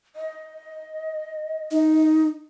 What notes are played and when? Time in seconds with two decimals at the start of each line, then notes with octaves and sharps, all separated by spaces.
0.16 D#5
1.71 D#4